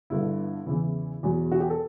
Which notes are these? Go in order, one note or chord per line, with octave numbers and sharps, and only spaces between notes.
G1 G2 D3 E4
E2 C#3 E3 E4
E2 B2 F#3
F#4
G4
A4